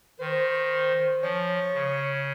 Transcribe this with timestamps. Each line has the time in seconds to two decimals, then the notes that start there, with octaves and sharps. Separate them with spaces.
0.20 D#3 C5
1.23 F3 C#5
1.74 C#3